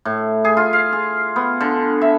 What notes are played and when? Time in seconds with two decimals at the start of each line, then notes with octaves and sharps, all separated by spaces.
0.05 A2
0.45 G#4
0.57 F4
0.73 F5
0.93 G#4
1.36 B3
1.61 D3
2.02 E5